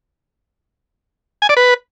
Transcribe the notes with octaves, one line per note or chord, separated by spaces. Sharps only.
G#5
D5
B4